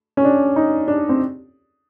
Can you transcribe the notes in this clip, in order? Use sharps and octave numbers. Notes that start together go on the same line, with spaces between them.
C#4
D4
D#4
D4
C4